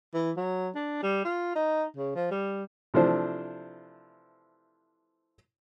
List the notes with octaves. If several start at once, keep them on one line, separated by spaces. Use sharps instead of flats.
E3
F#3
D4
G3
F4
D#4
C#3
F3
G3
C3 E3 F3 A3 D4 C5